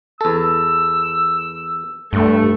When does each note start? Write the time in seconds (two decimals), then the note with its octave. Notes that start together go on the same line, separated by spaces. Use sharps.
0.21 E2 A4 E6
2.13 G2 A3